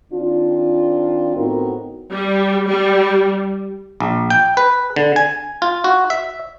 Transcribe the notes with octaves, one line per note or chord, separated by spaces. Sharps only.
D#3 C4 D4 F4
A2 B3 C4 D#4 F#4 A#4
G3
G3
A#1
G5
B4
D3
G#5
F4
F#4
E5